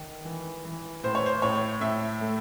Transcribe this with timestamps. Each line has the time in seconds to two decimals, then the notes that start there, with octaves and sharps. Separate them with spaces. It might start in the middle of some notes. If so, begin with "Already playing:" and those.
Already playing: D#3
0.25 E3
0.65 E3
1.04 A2 C5
1.15 C#5
1.26 C5
1.42 A2 C#5
1.81 A2 E5
2.21 A3